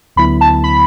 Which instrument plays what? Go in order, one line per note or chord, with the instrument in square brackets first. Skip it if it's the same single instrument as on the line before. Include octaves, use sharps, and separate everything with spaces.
[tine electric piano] D2 D3 F#3 B3 E4 [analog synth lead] B5
[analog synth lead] A5
B5